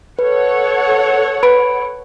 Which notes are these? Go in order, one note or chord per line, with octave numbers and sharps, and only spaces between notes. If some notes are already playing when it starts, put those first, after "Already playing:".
A4 B4 C#5 F#5
B4 B5 D7